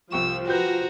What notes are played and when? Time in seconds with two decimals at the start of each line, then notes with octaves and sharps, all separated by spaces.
0.12 C2 F3 G4 C#6 E6
0.47 F#4 G4 B4 C5 A#5 G6